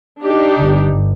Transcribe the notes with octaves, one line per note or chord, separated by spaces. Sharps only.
D4 D#4 G4
G1